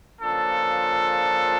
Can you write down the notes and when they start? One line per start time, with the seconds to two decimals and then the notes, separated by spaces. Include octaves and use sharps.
0.21 C#3 F3 A#3 D4 F4 A4